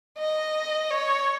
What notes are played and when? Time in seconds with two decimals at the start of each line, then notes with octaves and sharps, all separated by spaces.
0.19 D#5
0.90 C#5